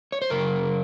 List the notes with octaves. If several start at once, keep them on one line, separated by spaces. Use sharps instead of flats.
C#5
C5
F#2 C#3 A#4